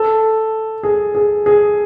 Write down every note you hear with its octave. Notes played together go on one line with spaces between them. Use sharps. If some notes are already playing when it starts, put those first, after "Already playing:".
Already playing: A4
G#4
G#4
G#4